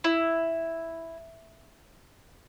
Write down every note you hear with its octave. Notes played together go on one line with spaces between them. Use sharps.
E4